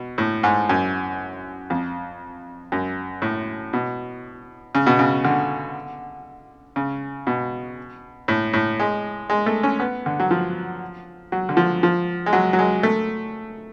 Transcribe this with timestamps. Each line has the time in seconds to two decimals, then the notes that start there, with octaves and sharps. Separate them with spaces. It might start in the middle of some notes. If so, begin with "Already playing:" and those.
Already playing: B2
0.18 A2
0.43 G#2
0.69 F#2
1.70 F2
2.72 F#2
3.22 A2
3.73 B2
4.75 C#3
4.87 B2
4.99 C#3
5.25 D3
6.76 C#3
7.27 B2
8.28 A2
8.53 A2
8.80 G#3
9.30 G#3
9.46 A3
9.63 C#4
9.80 B3
10.06 D3
10.20 F#3
10.31 F3
11.32 F#3
11.49 D3
11.57 F3
11.83 F3
12.26 G#3
12.33 F#3
12.53 F#3
12.59 G#3
12.83 A3